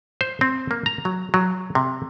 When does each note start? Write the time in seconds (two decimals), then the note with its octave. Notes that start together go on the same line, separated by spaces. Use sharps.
0.21 C5
0.41 C4
0.71 A#3
0.86 A#5
1.05 F#3
1.34 F#3
1.75 C3